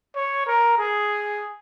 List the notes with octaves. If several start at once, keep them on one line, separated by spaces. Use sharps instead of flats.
C#5
A#4
G#4